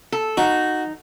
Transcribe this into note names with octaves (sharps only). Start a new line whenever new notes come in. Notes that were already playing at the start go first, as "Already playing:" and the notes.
A4
D#4 F#4